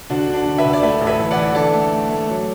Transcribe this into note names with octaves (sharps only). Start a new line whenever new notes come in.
D2 D4 F#4
D3
D4
D3
B4 E5
D2
D5
A3 B4 E5
A1
B4 E5
E3
D5 F#5
E3
D3 A4 D5
A3
A3
A3
F#3